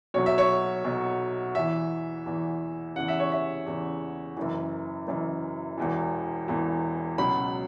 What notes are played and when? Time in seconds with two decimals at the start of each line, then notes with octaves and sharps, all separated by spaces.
0.14 B1 B2 F#3 C#5
0.26 E5
0.38 C#5
0.85 B1 B2 F#3
1.55 E2 E3 E5
2.26 E2 E3
2.96 E2 C#3 E3 F#5
3.08 E5
3.20 C#5
3.32 E5
3.66 E2 C#3 E3
4.37 F#1 F#2 E3
5.07 F#1 F#2 E3
5.78 E1 E2 E3
6.48 E1 E2 E3
7.18 C#2 B2 F#3 B5